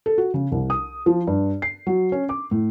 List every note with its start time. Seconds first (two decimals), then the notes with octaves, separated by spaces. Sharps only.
0.06 A4
0.18 F#4
0.34 C#3
0.52 C2
0.70 D#6
1.06 F3
1.27 G2
1.62 C7
1.87 F#3
2.12 C#4
2.29 D6
2.51 A2